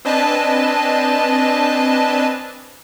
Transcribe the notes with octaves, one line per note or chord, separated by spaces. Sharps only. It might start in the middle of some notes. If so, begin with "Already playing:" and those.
C4 D4 B4 D#5 G#5 A5